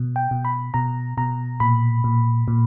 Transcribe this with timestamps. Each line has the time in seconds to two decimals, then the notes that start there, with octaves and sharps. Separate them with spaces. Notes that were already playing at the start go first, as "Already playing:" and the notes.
Already playing: B2
0.16 G5
0.31 B2
0.45 B5
0.74 B2 A#5
1.17 B2 A#5
1.60 A#2 B5
2.04 A#2
2.48 A#2